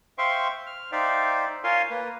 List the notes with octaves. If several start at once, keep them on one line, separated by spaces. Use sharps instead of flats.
C5 E5 F5 G5 C6 C#6
F6
D#4 C5 D5 E5 F5 G5
F4 A#4 C#5 F5 G#5 C6
A#3 B4